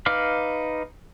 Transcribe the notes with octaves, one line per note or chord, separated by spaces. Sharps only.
D#4 B4 F5 D6 F6